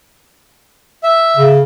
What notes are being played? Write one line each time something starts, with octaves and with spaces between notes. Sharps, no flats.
E5
C#3